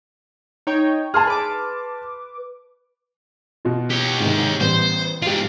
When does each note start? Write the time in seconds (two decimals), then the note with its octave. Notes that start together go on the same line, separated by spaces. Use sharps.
0.67 D#4 C#5 G5
1.14 G#4 A5 C6 F6
1.27 B4 D6
3.65 B2 F4
3.90 G4 C#5
4.20 G#2 C3 D#3
4.60 A1 G3 B3 C5
5.22 G#2 F4 G4 F5